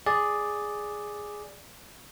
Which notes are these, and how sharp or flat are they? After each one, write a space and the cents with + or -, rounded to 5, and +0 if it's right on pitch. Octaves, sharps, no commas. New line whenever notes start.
G#4 +0 D5 +0